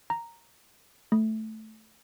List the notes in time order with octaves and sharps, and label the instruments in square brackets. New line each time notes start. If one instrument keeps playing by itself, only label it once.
[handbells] A#5
A3